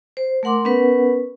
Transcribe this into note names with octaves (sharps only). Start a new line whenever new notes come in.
C5
A3 A#4 F#5 C6 D6
B3 C#4 A#4 B4 F#5